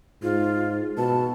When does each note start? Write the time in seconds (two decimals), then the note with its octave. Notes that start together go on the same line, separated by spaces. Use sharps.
0.22 G#2 F4
0.97 B2 A5